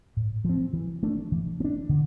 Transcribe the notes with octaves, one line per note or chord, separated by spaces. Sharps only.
A2
F3 C4
E3
A3 D4
E3
B3
D4
D3